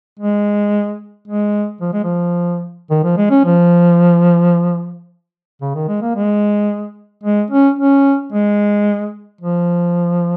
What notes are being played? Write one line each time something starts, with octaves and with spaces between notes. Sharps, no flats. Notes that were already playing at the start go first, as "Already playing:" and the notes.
G#3
G#3
F3
G#3
F3
D#3
F3
G#3
C#4
F3
C#3
D#3
G#3
A#3
G#3
G#3
C#4
C#4
G#3
F3